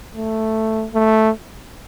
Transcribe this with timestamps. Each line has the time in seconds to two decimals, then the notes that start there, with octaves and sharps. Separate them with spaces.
0.14 A3
0.94 A3